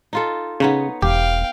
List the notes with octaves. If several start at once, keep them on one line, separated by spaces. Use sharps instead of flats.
D#4 F4 A4
C#3 B3 D#4 C#5
E1 G4 F5 G5